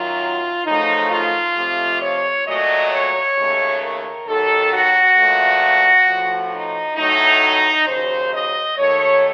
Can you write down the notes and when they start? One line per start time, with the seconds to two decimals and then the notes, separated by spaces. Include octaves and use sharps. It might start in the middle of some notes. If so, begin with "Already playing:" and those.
Already playing: F#2 D#3 F#3 F4
0.65 F#2 C#3 F3 A3 D#4
1.10 F4
1.55 F2 C3 F3 A3
2.00 C#5
2.46 A#2 F#3 A3 D#5
2.90 C#5
3.36 D#2 C#3 A3
3.81 A#4
4.26 D#2 D#3 F#3 A4
4.71 F#4
5.17 A#2 F3 A3
6.06 A2 F3 A3
6.52 D#4
6.97 A2 F#3 A3 D#4
7.87 D#2 C#3 F#3 C5
8.32 D#5
8.77 D#2 D#3 A3 C#5